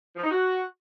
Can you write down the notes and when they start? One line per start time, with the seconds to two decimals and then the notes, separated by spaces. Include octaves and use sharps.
0.16 F3
0.24 D#4
0.31 F#4